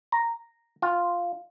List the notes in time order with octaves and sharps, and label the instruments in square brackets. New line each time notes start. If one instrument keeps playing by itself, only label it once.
[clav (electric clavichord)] A#5
F4